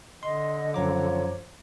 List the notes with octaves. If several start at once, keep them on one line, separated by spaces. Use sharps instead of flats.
D3 D#5 C6
F#2 F3 C#5 A#5 D6